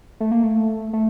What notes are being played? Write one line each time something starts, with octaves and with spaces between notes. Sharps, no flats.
A3
A#3
A3
A3